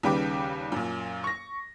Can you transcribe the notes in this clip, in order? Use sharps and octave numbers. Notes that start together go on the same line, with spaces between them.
D#2 C#3 G3 B4 G5 D6
F#2 A#2
C#6 A#6